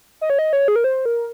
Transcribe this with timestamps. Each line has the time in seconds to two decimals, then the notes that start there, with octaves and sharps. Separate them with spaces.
0.21 D#5
0.30 C#5
0.39 D#5
0.53 C#5
0.68 G#4
0.76 A#4
0.84 C5
1.05 A#4